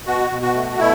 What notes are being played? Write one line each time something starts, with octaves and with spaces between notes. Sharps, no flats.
B2 F#4
B2
F#4
A3
B2 E4